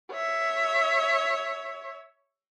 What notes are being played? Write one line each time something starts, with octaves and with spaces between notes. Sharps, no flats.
C#5 E5